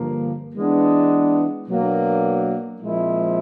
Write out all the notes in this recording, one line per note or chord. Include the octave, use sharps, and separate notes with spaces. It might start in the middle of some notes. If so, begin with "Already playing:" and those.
Already playing: G2 D3 F3 A#3
E3 G#3 B3 D4
B2 F#3 A#3 D4
A#2 F3 G#3 C4 E4